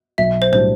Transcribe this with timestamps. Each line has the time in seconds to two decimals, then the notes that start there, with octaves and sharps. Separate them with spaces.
0.18 B1 E5
0.42 C5
0.52 A2 G3 D4 F#4 C5